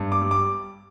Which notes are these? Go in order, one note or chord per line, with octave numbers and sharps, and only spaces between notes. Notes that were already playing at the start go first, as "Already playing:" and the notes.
Already playing: G2
D6
G3
D6